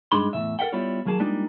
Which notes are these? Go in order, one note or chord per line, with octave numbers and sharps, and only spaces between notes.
G2 G#3 D4 D#4 B5 C6
E2 A2 C#3 E5
A4 A#4 E5 F#5 G5
G3 B3 E4 F4 C#5
D#2 F#3 A#3 G#4 A5
G3 G#3 A#3 D4 D#4 F4